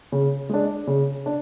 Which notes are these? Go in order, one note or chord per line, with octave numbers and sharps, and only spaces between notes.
C#3
G#3 D4
C#3
D4